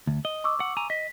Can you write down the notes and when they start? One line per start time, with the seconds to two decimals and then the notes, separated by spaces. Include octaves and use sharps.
0.07 D2
0.25 D#5
0.44 C#6 D6 E6
0.60 F#5
0.77 G#5 A#5
0.90 D#5 B6